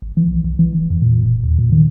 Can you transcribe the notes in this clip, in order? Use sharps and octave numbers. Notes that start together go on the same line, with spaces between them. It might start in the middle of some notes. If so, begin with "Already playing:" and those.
G#1
E3
B1
B1
E3
D#1
F2
A#2
D#1
D#2
A#2
D#3